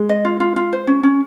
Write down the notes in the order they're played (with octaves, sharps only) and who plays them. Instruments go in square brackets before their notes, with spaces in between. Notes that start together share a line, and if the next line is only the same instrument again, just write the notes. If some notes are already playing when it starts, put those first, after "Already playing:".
Already playing: [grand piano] G#3
[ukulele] D#5
F4
F4
F4
C5
C#4
C#4